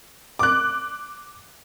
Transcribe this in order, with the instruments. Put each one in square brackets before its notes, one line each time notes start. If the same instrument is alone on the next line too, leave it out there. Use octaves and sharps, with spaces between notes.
[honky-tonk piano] D6 F#6